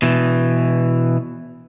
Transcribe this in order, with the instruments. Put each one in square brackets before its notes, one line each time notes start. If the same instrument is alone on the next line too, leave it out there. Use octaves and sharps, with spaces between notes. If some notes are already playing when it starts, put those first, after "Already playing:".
[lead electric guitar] B2 E3